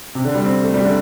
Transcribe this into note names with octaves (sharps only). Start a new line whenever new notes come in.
C3
D3
G3
C4
A3
G3
D3